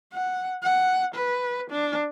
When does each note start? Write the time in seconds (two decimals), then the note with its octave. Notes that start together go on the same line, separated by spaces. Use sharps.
0.13 F#5
0.63 F#5
1.15 B4
1.71 D4